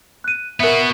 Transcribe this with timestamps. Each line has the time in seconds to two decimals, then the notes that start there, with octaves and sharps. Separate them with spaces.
0.24 F#6 D#7
0.60 B3 F#4 A#4 E5